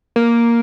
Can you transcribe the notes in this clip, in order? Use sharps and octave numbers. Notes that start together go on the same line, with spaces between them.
A#3